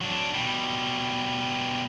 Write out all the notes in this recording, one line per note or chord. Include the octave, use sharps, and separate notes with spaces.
F#3 D4
B2 G3